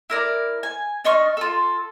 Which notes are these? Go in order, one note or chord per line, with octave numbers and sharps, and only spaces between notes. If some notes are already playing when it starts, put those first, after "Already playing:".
E4 A#4 D5
G#5
D4 D#5 C#6 F6
F4 A4